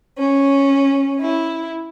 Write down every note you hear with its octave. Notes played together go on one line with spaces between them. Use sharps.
C#4
E4